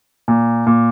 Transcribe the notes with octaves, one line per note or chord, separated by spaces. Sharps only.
A#2
A#2